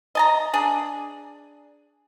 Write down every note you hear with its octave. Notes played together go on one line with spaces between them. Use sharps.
D#5 A5 A#5
D4 G#4